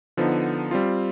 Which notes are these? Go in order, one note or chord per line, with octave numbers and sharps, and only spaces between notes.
D3 F3 B3 D#4
G3 C4 F4